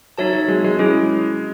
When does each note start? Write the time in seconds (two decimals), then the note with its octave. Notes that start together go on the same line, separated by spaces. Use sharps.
0.18 F#3 D#4 F#4 C#5 E5 A5
0.33 F#3
0.48 G#3
0.64 G#3
0.79 G#3 C#4 E4 G#4